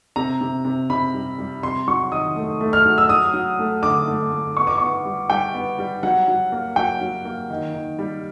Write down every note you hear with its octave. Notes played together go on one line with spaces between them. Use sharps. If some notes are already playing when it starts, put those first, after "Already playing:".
C3 A#5
C3
C3
C3 B5
G3
G3
C3 C6
F#3 C#6
D#3 D#6
A3
A3
F6
F#3
E6
F#3 D#6
F#3
A3
D3 D6
A3
A3
B3 C#6
D6
B3 C#6
G3
G3 G5
B3
G3
F#3 F#5
F#3
A#3
F#3 G5
F#3
A#3
D#3
D#3
G3